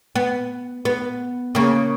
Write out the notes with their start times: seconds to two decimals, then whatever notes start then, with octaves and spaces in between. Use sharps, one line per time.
0.16 B3
0.85 B3
1.55 C#3 A#3